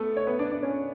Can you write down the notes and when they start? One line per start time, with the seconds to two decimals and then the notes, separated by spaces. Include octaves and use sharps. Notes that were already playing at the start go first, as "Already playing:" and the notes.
Already playing: A3 B3 A4
0.17 C#5
0.27 B3 B4
0.39 D4 D5
0.51 D4 D5
0.63 C#4 C#5